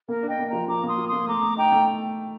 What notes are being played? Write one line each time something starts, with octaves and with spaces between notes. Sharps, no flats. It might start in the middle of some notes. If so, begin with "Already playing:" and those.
A#3 A#4
D4
D#5 G5
A#3
F3 G5 A#5
F3 A#5 D6
A#3 C6 D#6
F4
A#3 C6 D#6
A3 A#5 D6
A3
D#4 G5 A#5
A3